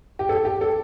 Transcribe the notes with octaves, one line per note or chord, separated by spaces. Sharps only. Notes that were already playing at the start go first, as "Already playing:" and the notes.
G4
A4
G4
A4